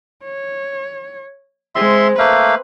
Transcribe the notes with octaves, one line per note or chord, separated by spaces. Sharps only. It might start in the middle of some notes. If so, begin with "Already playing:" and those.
C#5
G#3 C4 E5 C6
A3 A#3 B4 F5